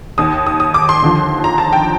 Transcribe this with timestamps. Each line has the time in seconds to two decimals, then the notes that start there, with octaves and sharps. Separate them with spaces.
0.18 D#2 D#3 D#6
0.47 D#6
0.60 D#6
0.74 D6
0.89 C6
1.02 D#2 D3 F3
1.44 A#5
1.58 A5
1.73 G5